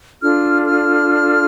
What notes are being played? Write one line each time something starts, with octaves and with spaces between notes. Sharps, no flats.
D4 F4 A4 F6
F6